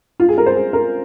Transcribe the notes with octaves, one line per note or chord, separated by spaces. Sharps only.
F4
G#4
A#4
C5
G#4
A#4